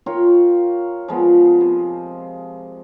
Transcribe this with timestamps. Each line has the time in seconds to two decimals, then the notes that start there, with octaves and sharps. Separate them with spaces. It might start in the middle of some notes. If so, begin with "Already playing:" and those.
0.06 F4 A#4 C#5 G5
1.08 F3 G#3 B3 A4
1.61 C3